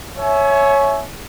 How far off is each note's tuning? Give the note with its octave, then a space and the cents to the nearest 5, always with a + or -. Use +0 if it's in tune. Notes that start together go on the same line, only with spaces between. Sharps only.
C#5 +0 E5 +0 G#5 +30